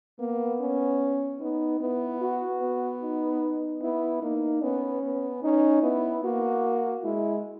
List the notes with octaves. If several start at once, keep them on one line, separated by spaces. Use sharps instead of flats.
A#3 B3
C#4
B3 D#4
B3 E4
F#4
B3
D#4
B3 E4
A#3 D#4
B3 C#4
B3
C#4 D#4
B3 E4
A#3 F#4
G#3 E4